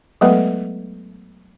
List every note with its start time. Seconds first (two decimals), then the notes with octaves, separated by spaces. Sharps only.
0.21 F#3 G#3 A3 B3 A4 B4